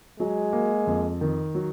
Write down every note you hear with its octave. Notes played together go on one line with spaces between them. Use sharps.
F#3 G#3
A#3
F2
D#3
F#3